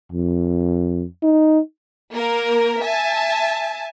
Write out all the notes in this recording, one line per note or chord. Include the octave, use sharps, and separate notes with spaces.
F2
D#4
A#3 A#4
E5 G#5 A5